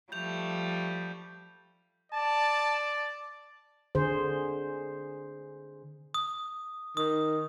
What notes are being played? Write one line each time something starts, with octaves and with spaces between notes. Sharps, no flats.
F3 G3 A3 G6 F7
D5 A5
D3 G#4 C5
D#6
D#3 D#6